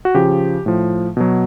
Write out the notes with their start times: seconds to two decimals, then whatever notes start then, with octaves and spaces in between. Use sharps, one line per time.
0.05 F#4
0.14 C#3 F3 G4
0.66 A2 F3
1.17 B2 F#3